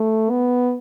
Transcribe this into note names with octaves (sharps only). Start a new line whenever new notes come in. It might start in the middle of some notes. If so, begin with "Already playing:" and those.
Already playing: A3
B3